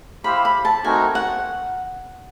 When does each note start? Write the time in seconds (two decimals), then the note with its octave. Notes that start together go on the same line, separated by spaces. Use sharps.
0.24 E4 G4 C5 F5 B5
0.45 B5
0.65 A5
0.84 A3 C4 D#4 F#4 A#4 G#5
1.15 F#5